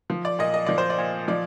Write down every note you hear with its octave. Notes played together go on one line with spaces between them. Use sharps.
F3
D5
A#2 D#5
D#5
F3 D5
C5
D5
A#2
F3 D5